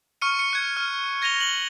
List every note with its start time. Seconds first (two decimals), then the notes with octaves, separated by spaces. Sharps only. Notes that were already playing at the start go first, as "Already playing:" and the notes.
0.21 C#6 F6 C#7 D#7
0.39 C#7
0.53 F#6 G#6
0.77 F6
1.22 G#6 A#6 D#7 F7 G7
1.40 F#7 G7